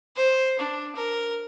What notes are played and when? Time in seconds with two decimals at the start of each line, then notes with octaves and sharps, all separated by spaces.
0.16 C5
0.59 D4
0.96 A#4